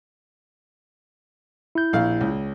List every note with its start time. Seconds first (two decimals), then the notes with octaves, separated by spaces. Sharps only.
1.75 E4 G6
1.93 A#1 F5
2.21 C#2